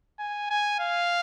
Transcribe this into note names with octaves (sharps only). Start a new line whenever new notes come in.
G#5
G#5
F5